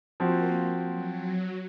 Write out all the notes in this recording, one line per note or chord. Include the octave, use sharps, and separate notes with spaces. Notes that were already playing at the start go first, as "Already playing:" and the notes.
F3 A#3 C4 F#4
F#3